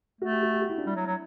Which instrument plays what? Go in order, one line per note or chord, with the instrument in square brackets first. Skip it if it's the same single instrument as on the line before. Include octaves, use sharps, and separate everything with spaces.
[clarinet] A3 [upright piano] F#4
[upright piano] G4
F#4
G4
F#4
E4
D4
[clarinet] G3 [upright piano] E4
[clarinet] F#3
F#3